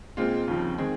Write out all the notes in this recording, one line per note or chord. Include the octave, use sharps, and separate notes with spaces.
A#2 G#3 C4 F4
D#2 C#3 F3 C4
D#3 G#3 C4 G#4